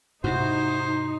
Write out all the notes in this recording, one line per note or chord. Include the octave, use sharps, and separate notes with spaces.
G#2 C3 D#4 E4 F#4 C5